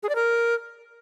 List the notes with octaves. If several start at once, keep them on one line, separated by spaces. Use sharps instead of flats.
G#4
D5
A#4